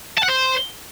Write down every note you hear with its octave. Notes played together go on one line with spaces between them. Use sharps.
A5
F#5
C5